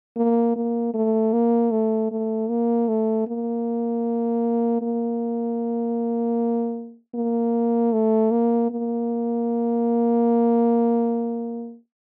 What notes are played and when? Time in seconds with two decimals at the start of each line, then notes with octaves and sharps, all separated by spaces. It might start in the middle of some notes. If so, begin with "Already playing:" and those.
0.17 A#3
0.56 A#3
0.94 A3
1.33 A#3
1.71 A3
2.11 A3
2.50 A#3
2.88 A3
3.27 A#3
4.82 A#3
7.15 A#3
7.93 A3
8.31 A#3
8.71 A#3